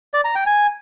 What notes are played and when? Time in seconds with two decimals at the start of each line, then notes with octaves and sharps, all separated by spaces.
0.14 D5
0.25 A#5
0.35 G5
0.46 G#5